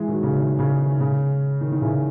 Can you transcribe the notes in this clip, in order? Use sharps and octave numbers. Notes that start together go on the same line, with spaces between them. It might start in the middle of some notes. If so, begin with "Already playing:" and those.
Already playing: E3 G#3
D#3 F#3
C#3
D#3
C#3
D#3
C#3
D#3
D#3
C#3 E3